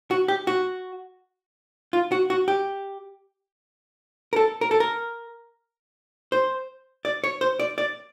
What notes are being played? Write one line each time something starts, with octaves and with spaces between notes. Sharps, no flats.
F#4
G4
F#4
F4
F#4
F#4
G4
A#4
A4
A#4
A4
A#4
C5
D5
C#5
C5
D5
D5